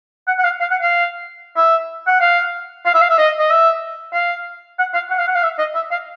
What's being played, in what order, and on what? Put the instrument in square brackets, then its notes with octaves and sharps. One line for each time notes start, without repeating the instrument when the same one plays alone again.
[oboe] F#5
F#5
F5
F5
F#5
F5
E5
F#5
F5
F5
E5
F5
E5
D#5
D#5
E5
F5
F#5
F5
F#5
F5
F#5
F5
E5
D#5
E5
F5